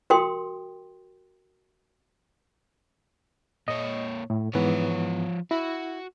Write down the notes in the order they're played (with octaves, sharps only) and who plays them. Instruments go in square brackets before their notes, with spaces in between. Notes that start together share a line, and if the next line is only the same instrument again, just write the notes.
[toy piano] F#4 G4 A#4 G5 C6 D#6
[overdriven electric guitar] A#2 C#5 [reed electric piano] D#5
[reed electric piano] A2
[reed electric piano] G#2 E3 B3 [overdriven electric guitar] F3 C#5
[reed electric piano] E4 [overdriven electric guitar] F#4